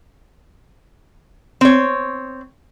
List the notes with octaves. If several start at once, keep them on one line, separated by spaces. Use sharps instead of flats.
C4 C#5